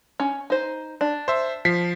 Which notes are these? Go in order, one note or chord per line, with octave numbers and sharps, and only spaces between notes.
C#4
D#4 C5
D4
C5 E5
F3 B6 C7